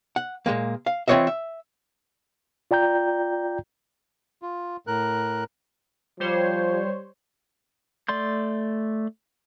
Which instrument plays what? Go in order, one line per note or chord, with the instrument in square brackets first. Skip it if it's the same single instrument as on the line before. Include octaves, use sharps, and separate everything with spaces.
[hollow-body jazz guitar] F#5
A#2 F3 G#3 A#3
F5
E3 C4 F4 C#5 D#5 E5
E5
[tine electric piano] F4 D5 G5 A#5 G6
[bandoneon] F4
A2 A#4 F#6
[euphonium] F3 [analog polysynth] G3 C5 C#5
[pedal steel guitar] A3 D5 C6 G6